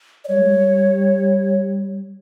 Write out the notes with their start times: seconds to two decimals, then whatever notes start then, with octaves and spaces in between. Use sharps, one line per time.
0.25 D5
0.28 G3 C#5
0.38 G#3
0.48 G3